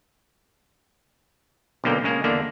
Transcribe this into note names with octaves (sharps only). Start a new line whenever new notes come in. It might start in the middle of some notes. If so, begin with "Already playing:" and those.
B1 B2 D3 A#3 G5
C#3 G#3 A#3
E2 D3 A#3 D4